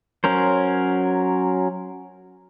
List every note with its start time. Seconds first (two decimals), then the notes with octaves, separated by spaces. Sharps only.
0.24 F#3 C#4 A#4 C5